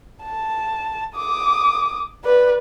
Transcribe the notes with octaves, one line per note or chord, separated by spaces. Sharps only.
A5
D6 D#6
B4 D5